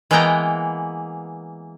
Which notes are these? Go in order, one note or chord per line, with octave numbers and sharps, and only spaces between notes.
E3 G#3 A#3 B3 G5 A#5